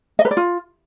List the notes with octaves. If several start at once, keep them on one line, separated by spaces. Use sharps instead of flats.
D#5
B4
D5
F4